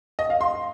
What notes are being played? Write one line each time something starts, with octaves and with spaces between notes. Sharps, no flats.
D#5
F5
C6